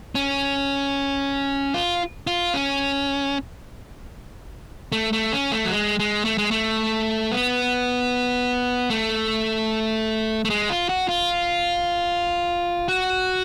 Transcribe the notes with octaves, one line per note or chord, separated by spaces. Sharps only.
C#4
F4
F4
C#4
A3
A3
C#4
A3
F#3
G#3
G#3
A3
G#3
A3
B3
A3
A3
G#3
F4
F#4
F4
F#4